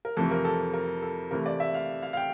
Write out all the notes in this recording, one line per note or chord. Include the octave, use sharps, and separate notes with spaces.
A#4
F2 C3 E3 A3 A4
A#4
A4
A#4
A4
C3 E3 A3 A#4
D5
E5
F5
F5
F5
G5